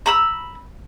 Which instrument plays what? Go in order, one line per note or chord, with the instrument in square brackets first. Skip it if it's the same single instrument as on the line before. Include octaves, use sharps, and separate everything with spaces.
[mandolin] A#5 B5 E6